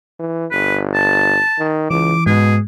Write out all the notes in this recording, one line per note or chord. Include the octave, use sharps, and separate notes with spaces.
E3
G1 B4
A5
D#3
C#2 E3 D6
G#2 B2 G#4